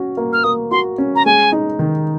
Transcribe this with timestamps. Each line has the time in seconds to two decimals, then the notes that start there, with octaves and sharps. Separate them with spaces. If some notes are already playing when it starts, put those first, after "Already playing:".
Already playing: C#4 F#4
0.17 A#3
0.33 F6
0.44 A#3 D#6
0.71 F#4 C6
0.98 C#4
1.16 A#5
1.26 G#3 G#5
1.52 D#4
1.79 D#3